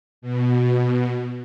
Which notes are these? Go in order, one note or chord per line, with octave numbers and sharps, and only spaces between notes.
B2